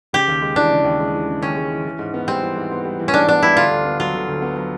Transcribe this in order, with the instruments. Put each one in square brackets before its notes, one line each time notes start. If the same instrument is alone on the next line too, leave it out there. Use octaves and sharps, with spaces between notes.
[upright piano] C#3 [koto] G4
[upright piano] D#2
G#3
[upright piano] E3 [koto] D4
[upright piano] C#3
D#2
G#3
E3
C#3
[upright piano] D#2 [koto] C#4
[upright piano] G#3
E3
E3
G#2
B3
[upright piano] G3 [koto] C4
[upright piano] E3
G#2
B3
G3
E3
[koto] C#4
[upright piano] G#2 [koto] D4
[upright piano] B3 [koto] D4
[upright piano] G3 [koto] E4
[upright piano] D3 [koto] F4
[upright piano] D2
B3
[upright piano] F#3 [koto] F4
[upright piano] D3
D2
B3
F#3